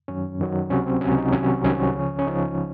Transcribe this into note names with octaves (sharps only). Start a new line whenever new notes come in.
F#2 D#3 F#3 C#4
F#2 D#3 F#3
C#2 C3 F#3 C#4
C4
C#2 C3 F#3 C#4
D#4
C2 C3 D#3 F#3 C#4
C4
C2 C3 D#3 F#3 C#4
C#2 C#3 F3
C#4
C#2 C#3 F3 D#4